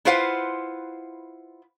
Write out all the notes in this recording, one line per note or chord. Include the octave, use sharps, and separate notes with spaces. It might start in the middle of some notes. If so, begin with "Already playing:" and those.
E4 F4 B4 C5 F5 F#5